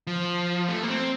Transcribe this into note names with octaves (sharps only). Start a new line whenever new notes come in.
F3
A3
A#3
C4